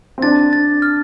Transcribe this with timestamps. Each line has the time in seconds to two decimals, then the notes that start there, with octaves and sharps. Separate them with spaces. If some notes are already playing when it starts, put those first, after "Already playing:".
0.18 C4
0.22 D4 A6
0.53 A6
0.82 F6